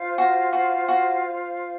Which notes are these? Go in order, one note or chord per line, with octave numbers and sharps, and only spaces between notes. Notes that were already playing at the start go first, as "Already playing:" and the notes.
Already playing: F4 C5 F5
F#4
F#4
F#4